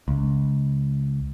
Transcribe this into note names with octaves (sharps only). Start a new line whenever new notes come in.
C#2